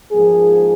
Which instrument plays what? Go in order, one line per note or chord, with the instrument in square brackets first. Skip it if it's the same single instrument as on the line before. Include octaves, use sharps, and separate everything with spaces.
[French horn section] G#2 F3 A#3 G#4